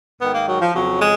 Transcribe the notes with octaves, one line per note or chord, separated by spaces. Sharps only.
G#2 D#3 B3
A#3
F#3
F3
F2 C#3 F#3
G#3